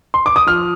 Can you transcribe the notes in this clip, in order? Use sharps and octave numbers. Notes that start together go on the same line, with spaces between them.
C6
D6
D#6
F3 F6